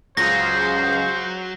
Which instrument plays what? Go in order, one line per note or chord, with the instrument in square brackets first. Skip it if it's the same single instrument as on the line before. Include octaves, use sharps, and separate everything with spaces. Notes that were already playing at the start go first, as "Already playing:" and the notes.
[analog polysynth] C#2 F4 G#4 [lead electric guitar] F#3 [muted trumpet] C5 [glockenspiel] A#6